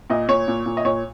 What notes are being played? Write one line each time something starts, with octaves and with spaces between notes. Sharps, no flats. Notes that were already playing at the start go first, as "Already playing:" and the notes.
A#2 D#5
A#2 C#5
A#2
A#2
D#5
A#2 C#5